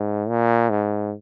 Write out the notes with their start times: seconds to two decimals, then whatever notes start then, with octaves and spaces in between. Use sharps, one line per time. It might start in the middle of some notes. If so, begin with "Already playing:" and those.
Already playing: G#2
0.28 A#2
0.70 G#2